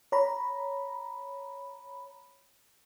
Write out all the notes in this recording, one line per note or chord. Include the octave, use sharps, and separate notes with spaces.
C#5 A#5 B5